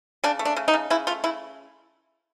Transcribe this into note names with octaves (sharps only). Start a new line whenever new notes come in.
C#3 D4
A3
D4
C#3
D#4
C#3
C#3 E4
A3 F4
C#3 E4